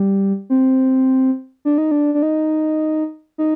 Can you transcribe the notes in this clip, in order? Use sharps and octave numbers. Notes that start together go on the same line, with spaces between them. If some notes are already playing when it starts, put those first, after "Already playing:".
Already playing: G3
C4
D4
D#4
D4
D4
D#4
D#4